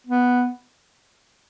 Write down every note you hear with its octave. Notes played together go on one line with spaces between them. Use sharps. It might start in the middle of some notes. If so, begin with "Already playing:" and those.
B3